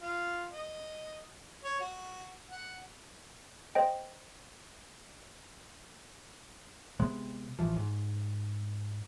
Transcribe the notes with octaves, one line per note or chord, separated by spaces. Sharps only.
F4
D#5
C#5
F#4
F#5
C5 D#5 G5
C3 G#3 B3
A1 E3 F3
G#2